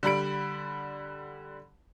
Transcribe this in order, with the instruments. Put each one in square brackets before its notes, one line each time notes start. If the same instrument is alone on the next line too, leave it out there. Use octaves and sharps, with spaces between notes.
[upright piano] D3 G3 B5 D7